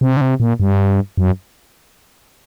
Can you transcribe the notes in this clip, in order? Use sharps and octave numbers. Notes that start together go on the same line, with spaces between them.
C3
D3
C3
A#2
G2
F#2